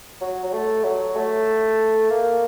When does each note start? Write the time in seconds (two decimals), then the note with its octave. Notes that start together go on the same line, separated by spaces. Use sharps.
0.21 F#3
0.43 F#3
0.53 A3
0.84 F#3
1.15 A3
2.10 A#3